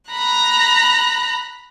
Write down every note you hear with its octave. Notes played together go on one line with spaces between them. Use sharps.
A#5 B5 F#6